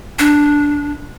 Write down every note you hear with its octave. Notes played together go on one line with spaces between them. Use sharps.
D4